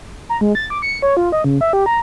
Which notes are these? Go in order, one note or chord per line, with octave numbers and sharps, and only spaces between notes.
A#5
G#3
A6
D6
C#7
C#5
F4
D#5
C#3
E5
G4
A#5